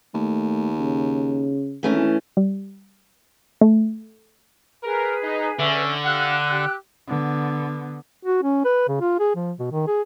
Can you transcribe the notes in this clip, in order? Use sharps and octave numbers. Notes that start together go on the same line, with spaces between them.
D#2 A3
C#3
G#1 E3 A3 C#4
G3
A3
G#4 A#4 B4
D#4
D3 C#4 E5
G4 F5 F#5 E6 F#6
G4
D3 B3
F#4
C#4
B4
C#3
F4
G#4
F3
B2
D#3
G#4